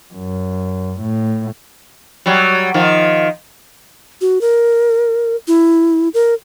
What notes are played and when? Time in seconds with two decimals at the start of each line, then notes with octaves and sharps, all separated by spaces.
0.14 F#2
1.01 A2
2.26 F#3 G3
2.74 D#3 F3
4.21 F#4
4.41 A#4
5.48 E4
6.14 A#4